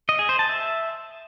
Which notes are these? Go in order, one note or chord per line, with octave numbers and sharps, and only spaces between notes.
D#5
G#4
C5
A5
E5